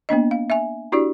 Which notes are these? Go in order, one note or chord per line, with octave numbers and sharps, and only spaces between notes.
A#3 B3 D4 D#5
F5
E5 G#5
D4 E4 F#4 G4 D5